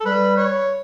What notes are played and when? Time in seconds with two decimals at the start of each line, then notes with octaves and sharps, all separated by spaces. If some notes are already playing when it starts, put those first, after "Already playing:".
0.01 A4
0.05 G3 B4
0.37 C#5